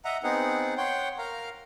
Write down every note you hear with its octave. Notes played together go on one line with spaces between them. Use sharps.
D#5 E5 F#5 A#5
B3 C4 D#4 G#4 F#5
C#5 F#5 G5 C6
A#4 F5 A#5